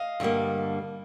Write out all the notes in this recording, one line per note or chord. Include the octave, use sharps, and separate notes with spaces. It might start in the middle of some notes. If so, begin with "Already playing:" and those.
Already playing: D#5 F5
G2 D3 G3 A#3